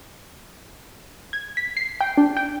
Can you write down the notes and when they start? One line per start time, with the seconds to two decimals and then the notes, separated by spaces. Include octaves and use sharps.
1.33 G#6
1.57 B6
1.77 C7
2.01 G5
2.17 D4
2.37 G5